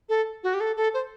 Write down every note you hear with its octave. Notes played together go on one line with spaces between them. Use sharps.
A4
F#4
G4
A4
A4
C5